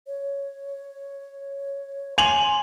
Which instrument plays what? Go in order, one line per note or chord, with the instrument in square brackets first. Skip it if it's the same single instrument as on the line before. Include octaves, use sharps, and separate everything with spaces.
[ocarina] C#5
[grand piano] G#5 F7 F#7 [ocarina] C6